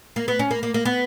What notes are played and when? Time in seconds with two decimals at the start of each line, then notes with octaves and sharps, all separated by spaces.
0.16 A#3
0.28 B3
0.39 C#4
0.51 A#3
0.63 A#3
0.74 A#3
0.85 B3